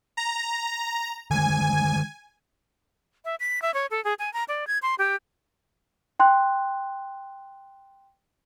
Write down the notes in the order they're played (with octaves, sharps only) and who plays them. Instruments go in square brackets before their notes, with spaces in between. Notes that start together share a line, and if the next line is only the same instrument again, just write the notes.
[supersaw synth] A#5
[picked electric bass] D3 D#3 G#3 [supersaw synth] G#5
[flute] E5
B6
E5
C#5
A4
G#4
G#5
A#5
D5
G#6
C6
G4
[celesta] G5 C6 F#6